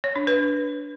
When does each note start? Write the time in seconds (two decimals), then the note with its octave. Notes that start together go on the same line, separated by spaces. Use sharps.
0.04 C#5
0.16 D4
0.27 B4